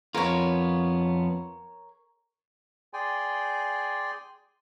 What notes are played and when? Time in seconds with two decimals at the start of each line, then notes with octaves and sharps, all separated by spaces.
0.15 F2 B3 F4 A#4 C#5
2.93 G#4 D5 G5 G#5 C6